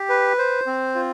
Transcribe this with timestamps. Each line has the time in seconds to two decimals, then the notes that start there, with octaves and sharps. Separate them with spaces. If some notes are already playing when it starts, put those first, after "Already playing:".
Already playing: G4
0.09 B4
0.38 C5
0.67 C4
0.95 F4